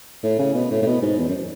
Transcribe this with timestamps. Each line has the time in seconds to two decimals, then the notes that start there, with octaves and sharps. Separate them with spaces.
0.23 A2
0.39 C#3
0.54 B2
0.71 A2
0.82 A2
0.86 B2
1.02 G#2
1.18 E2
1.28 F#2